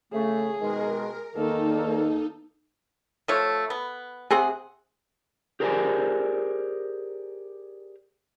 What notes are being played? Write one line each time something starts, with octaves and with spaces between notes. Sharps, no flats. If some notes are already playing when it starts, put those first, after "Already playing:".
C#3 A3 G#4
B2 D#3 G#3 A#4
E2 D#3 A#3 D#4 A4
F3 A3 C#5
B3
C3 C4 G#4 F#5
G4 G#4 A#4 C5 D5 G#5